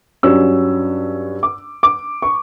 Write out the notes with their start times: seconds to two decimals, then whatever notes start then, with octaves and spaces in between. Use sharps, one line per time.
0.23 G2 F#3 C#4 E6
1.43 D6
1.83 D6
2.22 C#6